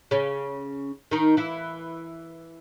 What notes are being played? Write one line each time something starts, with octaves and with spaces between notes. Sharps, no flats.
C#3 C#4
D#3 D#4
E3 E4